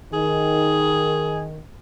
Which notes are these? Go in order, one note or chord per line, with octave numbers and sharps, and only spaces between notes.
D#3 G#4